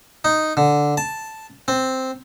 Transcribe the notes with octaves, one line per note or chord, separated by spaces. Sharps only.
D#4
D3
A5
C4